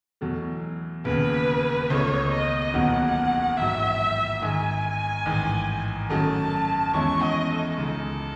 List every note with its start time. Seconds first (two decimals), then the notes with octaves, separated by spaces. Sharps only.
0.21 E2 B2 F#3 A3
1.05 E1 D#2 C#3 B4
1.90 C#2 B2 A3 C#5
2.32 D#5
2.74 E1 D#2 D#3 F#3 B3 F#5
3.57 A1 G#2 F#3 E5
4.41 G#2 D#3 G#3 G#5
5.25 A1 G#2 D#3
6.10 F#2 D#3 F#3 A3 A5
6.94 E2 D#3 G#3 C#4 E4 C#6
7.22 D#5
7.50 A4
7.78 C#2 C#3 G#3 D#4